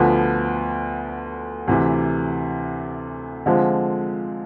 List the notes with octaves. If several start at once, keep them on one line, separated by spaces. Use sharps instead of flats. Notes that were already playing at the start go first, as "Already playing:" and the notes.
Already playing: D2 D3 F3 B3
D2 C3 E3
D3 F3 G#3 C4 F4